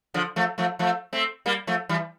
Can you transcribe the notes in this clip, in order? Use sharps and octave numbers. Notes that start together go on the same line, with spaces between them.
D3 F3
F3 A3
F3 A3
F3 A3
A3 C4
G3 A#3
F3 A3
E3 G3